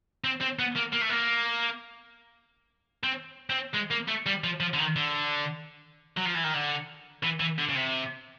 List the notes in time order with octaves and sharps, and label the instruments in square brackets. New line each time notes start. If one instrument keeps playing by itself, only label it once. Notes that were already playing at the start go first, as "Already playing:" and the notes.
[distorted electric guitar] C4
C4
B3
A#3
A#3
A3
A#3
C4
C4
G#3
A#3
A3
G3
F3
F3
D3
D#3
D3
F#3
F3
E3
D#3
D3
E3
E3
D3
C#3
C3